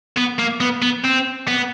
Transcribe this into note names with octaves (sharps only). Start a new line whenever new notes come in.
B3
A#3
B3
B3
C4
B3